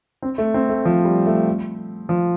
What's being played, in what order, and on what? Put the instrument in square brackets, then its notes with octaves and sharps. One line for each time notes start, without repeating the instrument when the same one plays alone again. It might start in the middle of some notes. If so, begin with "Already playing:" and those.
[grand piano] C4
A3
C4
A3
F3
G3
A3
F3